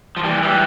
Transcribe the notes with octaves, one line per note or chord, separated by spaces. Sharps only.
F3
E3 G3
E3 G3